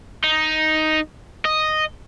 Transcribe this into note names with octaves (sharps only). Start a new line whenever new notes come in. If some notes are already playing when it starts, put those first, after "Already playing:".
D#4
D#5